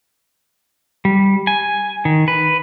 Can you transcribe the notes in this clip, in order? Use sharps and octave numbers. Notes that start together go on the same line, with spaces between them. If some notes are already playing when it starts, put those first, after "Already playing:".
G3
G#5
D#3
B4